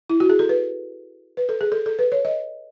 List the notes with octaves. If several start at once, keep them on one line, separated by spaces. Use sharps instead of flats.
E4
F#4
G#4
A4
B4
B4
A4
G#4
A4
A4
B4
C#5
D#5